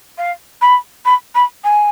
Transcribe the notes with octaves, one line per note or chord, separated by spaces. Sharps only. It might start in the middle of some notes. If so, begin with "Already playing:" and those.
F5
B5
B5
B5
G#5